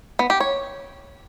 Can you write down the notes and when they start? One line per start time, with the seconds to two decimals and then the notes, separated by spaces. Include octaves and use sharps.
0.19 B3
0.30 G4
0.40 C#5